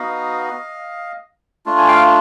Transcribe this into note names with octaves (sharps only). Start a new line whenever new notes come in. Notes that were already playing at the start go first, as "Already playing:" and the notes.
Already playing: B3 D#4 F#4 D#5 F5
A3 D4 F4
G#5
F5 G5